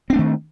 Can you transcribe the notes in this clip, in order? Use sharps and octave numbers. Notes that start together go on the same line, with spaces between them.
D#3 A3 C4 D4